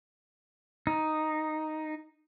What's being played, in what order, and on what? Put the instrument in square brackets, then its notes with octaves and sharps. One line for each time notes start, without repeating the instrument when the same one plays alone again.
[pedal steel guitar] D#4